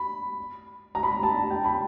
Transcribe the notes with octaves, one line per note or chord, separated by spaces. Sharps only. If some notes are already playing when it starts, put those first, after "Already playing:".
Already playing: B5
A#5
B5
A5
G5
B5